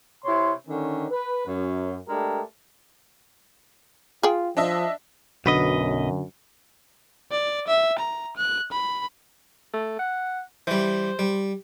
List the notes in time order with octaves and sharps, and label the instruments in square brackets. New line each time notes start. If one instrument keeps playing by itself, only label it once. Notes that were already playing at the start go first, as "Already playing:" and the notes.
[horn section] C3 E4 C#5 C6
D3 D#3 C#4
B4
F#2
G#3 A3 D4 G4 A4 A#4
[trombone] F4 [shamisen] G#4 G5
[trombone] F3 [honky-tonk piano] D4 D#5 E5
[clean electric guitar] B1 B4 D#5 [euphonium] F#2 [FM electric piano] D3 F#4
[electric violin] D5
E5
A#5
F#6
B5
[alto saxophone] A3
F#5
[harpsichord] E3 G3 [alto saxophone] C5
[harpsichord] G3